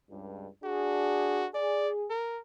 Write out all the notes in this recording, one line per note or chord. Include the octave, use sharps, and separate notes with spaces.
C#2 G2
D4 F#4 G#4
G#4 D5
A#4